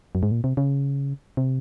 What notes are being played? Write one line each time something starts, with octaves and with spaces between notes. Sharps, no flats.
F#2
G#2
A#2
C3
C#3
C3